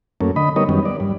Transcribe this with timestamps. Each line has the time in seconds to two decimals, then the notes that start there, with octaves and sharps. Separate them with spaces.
0.21 F#2 A3 A#3 C#4
0.36 D3 D#5 B5
0.56 G3 B3 D#4 A#4 C#5 D#5
0.69 F#2 D#3 G3 B3 C#4
0.85 D5
1.00 G2